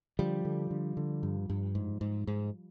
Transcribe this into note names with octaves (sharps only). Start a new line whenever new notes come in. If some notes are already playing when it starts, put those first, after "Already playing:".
D3 F3 G3
D3
D3
D3
G2
G2
G#2
G#2
G#2